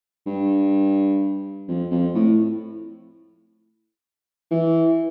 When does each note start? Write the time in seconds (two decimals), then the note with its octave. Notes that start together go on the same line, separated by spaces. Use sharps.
0.26 G2
1.68 F2
1.92 F2
2.15 A2
4.51 E3